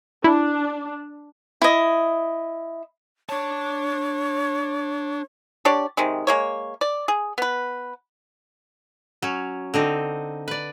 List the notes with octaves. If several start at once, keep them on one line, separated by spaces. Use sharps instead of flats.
D4 E4
E4 D#5
D4 C#5 A5
D4 G4 C#5 D5
C3 D#3 G#3
G#3 A#3 C#5
D5
G#4
B3 B4
F#3 C#4
D3 C4 D#4
B4 D5